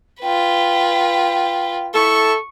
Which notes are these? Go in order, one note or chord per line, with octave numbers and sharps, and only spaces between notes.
F4 B4 G5
E4 A4 C#6